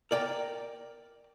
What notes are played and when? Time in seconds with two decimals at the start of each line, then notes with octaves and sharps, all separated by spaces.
0.11 A#4 D5 G5 G#5 A#5